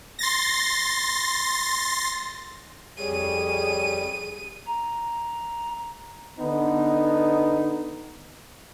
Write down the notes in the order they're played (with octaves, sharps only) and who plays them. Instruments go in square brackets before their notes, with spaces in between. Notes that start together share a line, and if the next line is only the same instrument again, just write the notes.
[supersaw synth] C6 A6 A#6
[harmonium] F2 C#5 [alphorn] G3 [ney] G#4 [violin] D#7
[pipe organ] A#5
[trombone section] D3 B3 D#4